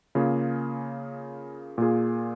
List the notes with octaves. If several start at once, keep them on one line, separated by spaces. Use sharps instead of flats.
C#3 A#3 F4 G#4
A#2 A#3 F4 G#4